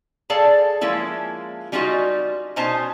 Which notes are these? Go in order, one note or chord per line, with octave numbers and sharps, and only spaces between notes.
G#4 A4 D5 F5 A5
F3 G#3 A#3 C#4 E4
G3 C#4 D#4 F4 F#4 D#5
B2 C#4 D#4 C5 D#5 A5